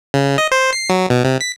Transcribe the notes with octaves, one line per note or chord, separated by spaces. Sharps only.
C#3
D#5
C5
C7
F#3
B2
C3
B6